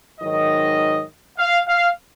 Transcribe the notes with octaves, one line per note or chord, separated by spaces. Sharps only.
G#2 D#3 F#3 D#5
F5
F5